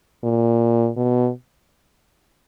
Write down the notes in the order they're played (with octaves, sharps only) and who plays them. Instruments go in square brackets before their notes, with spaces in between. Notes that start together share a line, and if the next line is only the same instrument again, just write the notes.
[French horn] A#2
B2